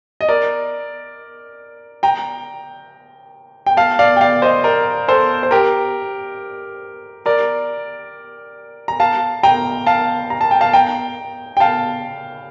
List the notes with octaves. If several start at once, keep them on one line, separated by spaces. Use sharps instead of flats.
D#5
A#4 D5
G5 A#5
G5
F5 A5
D5 F5
G5
D5 F5
C5 D#5
A#4 D5
A4 C5
C5
G4 A#4
A#4 D5
A#5
F5 A5
G5 A#5
F5 A5
A#5
A5
G5
F5 A5
G5 A#5
G5
F5 A5